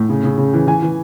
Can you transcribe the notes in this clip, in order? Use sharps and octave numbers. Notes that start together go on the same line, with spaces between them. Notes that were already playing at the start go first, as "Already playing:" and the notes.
Already playing: A2
C#3
C#3
C#3
E3
E3 G#5
E3